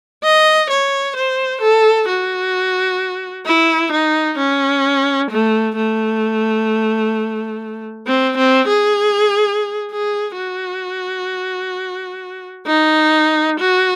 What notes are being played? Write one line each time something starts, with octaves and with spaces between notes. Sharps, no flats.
D#5
C#5
C5
A4
F#4
E4
D#4
C#4
A3
A3
C4
C4
G#4
G#4
F#4
D#4
F#4